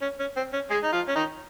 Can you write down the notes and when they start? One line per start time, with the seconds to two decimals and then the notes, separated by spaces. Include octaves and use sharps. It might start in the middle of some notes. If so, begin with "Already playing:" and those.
0.02 C#4
0.20 C#4
0.37 C4
0.53 C#4
0.70 G#3 G#4
0.84 D#4
0.93 F3 F4
1.08 C#4
1.16 D#3 D#4